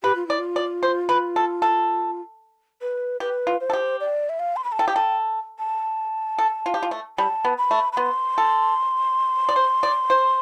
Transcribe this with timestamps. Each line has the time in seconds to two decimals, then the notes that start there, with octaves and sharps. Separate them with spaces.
0.03 G4 B4
0.15 F4
0.27 E4 D5
0.39 F4
0.56 D5
0.83 C5
1.09 B4
1.36 A4
1.62 A4
2.81 B4
3.20 G4 B4
3.47 F4
3.61 C5
3.70 A4
3.73 G4
4.00 D5
4.29 E5
4.39 F5
4.56 C6
4.64 B5
4.72 A5
4.79 A4 G5
4.88 G4
4.96 A4
5.59 A5
6.38 A4
6.66 F4
6.74 G4
6.83 F4
6.91 A3
7.18 G3 A5
7.45 B3
7.58 B5
7.71 A3
7.93 B5
7.97 B3 C6
8.38 A4
9.49 D5
9.56 C5
9.83 D5
10.10 C5